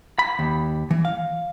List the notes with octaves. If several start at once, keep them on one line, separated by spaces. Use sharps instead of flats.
B5
D#2
E3
F5